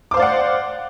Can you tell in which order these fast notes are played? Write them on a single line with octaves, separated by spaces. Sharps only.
D6 C5 F5 D5 F#5